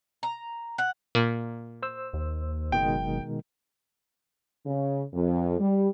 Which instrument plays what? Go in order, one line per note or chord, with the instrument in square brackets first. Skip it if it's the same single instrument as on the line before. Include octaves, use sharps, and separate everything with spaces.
[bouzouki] A#5
F#5
[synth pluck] A#2
[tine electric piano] C5 E6
[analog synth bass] D#2
[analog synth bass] F#1 [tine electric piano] B2 D#3 G#3 [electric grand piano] G5
[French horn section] C#3
F2
G3